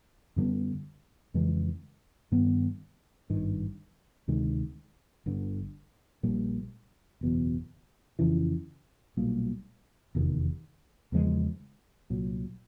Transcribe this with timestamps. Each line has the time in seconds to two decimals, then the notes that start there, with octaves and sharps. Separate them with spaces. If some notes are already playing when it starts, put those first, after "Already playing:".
0.36 F#2 D3 G3 B3
1.34 F2 C#3 E3 G#3
2.32 G2 D#3 G3 B3
3.30 G#1 G2 D#3
4.28 D2 C3 D#3 G#3
5.26 G1 G2 D3
6.23 A#1 A#2 G3
7.21 F#1 E2 B2
8.19 F2 C#3 E3
9.17 B1 A#2 G3 A#3
10.15 F1 E2 C3 D#3
11.12 E2 C#3 F3 G#3
12.10 C2 A#2 F#3